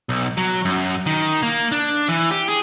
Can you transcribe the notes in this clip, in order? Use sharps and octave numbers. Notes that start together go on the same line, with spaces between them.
B1
F#3
F#2
D#3
A#3
D4
E3
G4
G#4